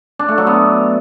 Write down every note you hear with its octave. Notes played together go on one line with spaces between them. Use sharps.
D4
A3
F#3
B3